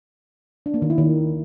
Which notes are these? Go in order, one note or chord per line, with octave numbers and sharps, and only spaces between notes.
D4
A#3
D#3
E4
D#3